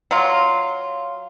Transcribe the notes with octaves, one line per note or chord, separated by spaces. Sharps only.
F#3 F4